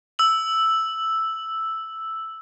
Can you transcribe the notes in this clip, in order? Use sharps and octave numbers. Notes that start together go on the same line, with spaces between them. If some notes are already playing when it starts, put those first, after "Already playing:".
E6 F#7